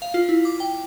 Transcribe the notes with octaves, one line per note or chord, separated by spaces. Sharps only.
F5
F4
E4
D6
G5